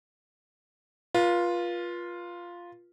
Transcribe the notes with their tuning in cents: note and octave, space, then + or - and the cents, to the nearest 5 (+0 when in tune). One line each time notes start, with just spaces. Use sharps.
F4 +0 B4 -40